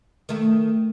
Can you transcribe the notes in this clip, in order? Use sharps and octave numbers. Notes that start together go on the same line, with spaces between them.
D#3 A3